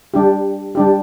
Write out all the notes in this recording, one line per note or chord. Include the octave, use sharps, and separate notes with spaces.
G3 D4 G4
G3 D4 G4